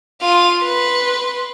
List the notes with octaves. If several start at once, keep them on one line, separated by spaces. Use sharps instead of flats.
F4 D#7
B4 C6